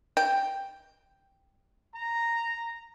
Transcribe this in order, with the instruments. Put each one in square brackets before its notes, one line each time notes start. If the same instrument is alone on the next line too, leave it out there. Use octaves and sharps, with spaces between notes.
[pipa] G5
[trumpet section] A#5